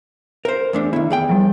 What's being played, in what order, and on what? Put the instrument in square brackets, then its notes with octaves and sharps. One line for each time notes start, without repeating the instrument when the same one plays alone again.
[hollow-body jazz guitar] A#4 C5
E2 A3 D4
[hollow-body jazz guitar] D#3 E4 [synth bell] B3
[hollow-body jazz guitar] E2 G#4 G5
[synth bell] F3 G3